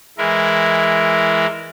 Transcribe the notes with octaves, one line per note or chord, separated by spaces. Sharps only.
E3 G#3 E4 A#4